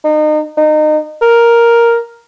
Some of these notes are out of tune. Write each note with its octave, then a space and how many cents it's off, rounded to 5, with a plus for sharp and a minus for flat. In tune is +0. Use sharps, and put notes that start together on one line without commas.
D#4 -35
D#4 -25
A#4 +5